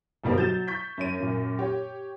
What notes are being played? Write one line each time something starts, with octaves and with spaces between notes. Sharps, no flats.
G1 B2 G3 A#3 C4
F#3 G6 A6 E7
C#6 G6 B6
F#2 C#5 D#7
F#2 A#2
G4 C#5